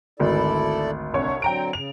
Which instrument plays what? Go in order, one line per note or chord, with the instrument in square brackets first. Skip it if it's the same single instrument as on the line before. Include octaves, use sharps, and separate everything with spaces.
[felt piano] G#1 D2 [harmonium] E4 A4 D5
[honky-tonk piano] C2 C#5 C#6 [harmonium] D4
[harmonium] D3 F#3 C4 [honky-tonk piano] G5 A#5 D7
[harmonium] C#3 [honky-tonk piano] F7